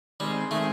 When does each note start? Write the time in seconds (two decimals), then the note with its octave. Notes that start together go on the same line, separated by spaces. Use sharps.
0.20 D#3 G3 G#3 C4
0.51 D#3 A3
0.54 G#3 C4